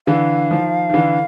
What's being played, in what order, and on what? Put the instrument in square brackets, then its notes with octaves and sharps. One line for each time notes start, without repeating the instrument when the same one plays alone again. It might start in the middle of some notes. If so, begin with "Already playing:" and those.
[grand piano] D3 E3 [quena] F5
[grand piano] D#3 F3
D#3
D3 E3